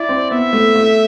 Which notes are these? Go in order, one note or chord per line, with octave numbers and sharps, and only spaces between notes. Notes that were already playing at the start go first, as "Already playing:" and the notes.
Already playing: E4 D5
C4
B3 E5
A3
A3